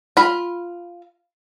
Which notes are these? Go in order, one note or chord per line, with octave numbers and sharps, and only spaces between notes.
F4 B5